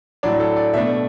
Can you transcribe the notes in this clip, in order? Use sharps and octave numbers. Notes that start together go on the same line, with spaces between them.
A2 F#3 D4 D5
A4
D5
B2 A3 D4 E5